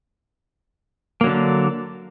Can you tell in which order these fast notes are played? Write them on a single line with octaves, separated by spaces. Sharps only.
A#3 F#3 D3 D4